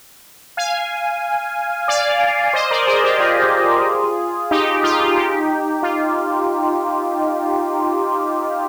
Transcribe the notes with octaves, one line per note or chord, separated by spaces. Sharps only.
F5 G#5
D5 F5
C5 D#5
A#4 D5
G#4 C5
G4 A#4
F4 G#4
D#4 G4
F4
D#4 G4
F4